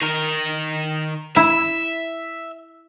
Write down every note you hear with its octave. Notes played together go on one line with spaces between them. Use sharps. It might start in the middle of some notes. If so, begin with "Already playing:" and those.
D#3 A#4
E4 E5